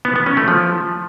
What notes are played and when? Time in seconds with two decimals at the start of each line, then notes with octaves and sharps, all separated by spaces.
0.05 B3
0.16 B3
0.26 C#4
0.37 A3
0.48 F3